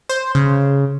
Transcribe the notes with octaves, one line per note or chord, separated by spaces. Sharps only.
C5
C#3